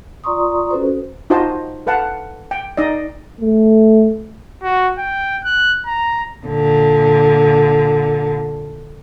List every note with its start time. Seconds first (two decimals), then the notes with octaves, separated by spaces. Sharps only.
0.24 F4 D5 A#5 C6 C#6 D#6
0.70 C#4 F#4 A4 B4 C5
1.30 D#4 F4 F#4 C5 D#5 A5
1.86 A4 B4 F5 F#5 A5
2.51 G5
2.77 D#4 D5 D#5
3.41 A3
4.63 F#4
4.99 G5
5.45 F#6
5.86 A#5
6.45 A#2 D3